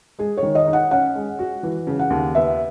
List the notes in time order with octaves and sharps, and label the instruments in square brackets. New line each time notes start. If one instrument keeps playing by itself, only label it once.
[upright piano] G#3 [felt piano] G#4
[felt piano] C#5
[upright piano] D#3
[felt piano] D#5
[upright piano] D#4
[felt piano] F#5
[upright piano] C#4 [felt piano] F#5
[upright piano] G#3
F#4
E3
C#3
[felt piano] F#5
[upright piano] D#2
[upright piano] B3 [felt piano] E5